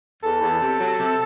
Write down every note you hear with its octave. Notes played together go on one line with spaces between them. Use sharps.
E2 A4
E2
C3
F#3
C3